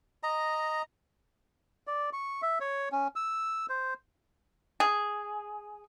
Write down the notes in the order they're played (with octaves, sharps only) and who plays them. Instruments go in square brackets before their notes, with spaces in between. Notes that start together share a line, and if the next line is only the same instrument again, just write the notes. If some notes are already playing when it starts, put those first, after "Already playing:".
[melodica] D#5 A#5
D5
C#6
E5
C#5
C#4
E6
C5
[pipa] G#4